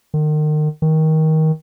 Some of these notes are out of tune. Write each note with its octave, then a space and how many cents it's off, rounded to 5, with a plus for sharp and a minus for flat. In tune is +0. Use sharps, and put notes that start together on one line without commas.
D#3 -35
D#3 +20